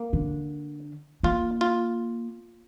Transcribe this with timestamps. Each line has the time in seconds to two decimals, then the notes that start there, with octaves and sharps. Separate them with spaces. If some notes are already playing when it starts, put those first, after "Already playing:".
Already playing: A#3
0.13 D3
1.23 A#3 F4
1.61 F4